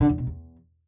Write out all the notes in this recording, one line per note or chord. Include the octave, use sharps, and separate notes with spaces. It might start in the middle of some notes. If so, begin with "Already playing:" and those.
D3
E2
B2
E2